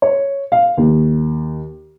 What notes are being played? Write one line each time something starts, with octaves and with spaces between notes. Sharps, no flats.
C#5
F5
D#2